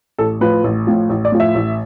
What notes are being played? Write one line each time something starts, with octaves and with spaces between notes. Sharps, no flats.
A1 A4
A2 F3 B4
A1
A2 F3
A1
D5
A2 F3
E5
A1